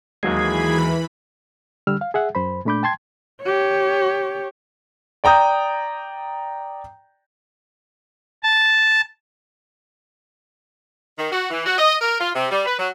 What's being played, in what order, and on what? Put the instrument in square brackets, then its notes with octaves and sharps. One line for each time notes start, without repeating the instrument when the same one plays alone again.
[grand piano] D#2 F#3 G#3 [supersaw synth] E3 B5 [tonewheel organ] G#4
[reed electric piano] D3 G3 E6 F6
F5
G#4 E5 F#5
F#2 C5 B5
A#2 A3 D4 B5 D6 G6
G5 A5 C6 G#6
[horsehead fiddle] G4 C#5
[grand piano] D5 G5 A#5 D#6 G6
[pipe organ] A5
[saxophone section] D#3
F#4
E3
F#4
D#5
A#4
F4
C3
G3
B4
F#3